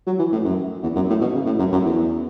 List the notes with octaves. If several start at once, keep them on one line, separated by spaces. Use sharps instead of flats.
F#3
E3
A2
F#2
E2
F#2
A2
B2
C#3
A2
F#2
F#2
E2